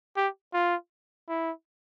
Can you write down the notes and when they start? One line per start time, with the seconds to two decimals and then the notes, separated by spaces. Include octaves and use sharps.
0.17 G4
0.53 F4
1.29 E4